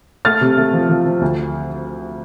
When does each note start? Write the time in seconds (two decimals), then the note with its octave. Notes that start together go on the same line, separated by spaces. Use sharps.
0.25 A3 F6 A6
0.41 C3
0.58 A3
0.74 F3
0.89 F3
1.06 F3
1.21 D2